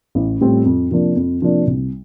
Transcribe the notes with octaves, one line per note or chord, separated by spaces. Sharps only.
A1
A2 G3 C4 F4
F2
C3 F3 A#3 D4
F2
C3 F3 A#3 D4
C2